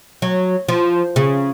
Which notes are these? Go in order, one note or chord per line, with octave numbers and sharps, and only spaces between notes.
F#3
F3
C#3